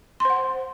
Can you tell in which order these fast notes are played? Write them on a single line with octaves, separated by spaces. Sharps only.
C6 C5 F#5